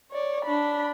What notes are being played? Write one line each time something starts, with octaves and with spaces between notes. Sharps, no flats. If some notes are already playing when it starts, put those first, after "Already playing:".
C#5 D5
D4 B5